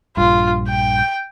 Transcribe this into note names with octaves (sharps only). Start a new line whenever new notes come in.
A#1 G2 F4
G5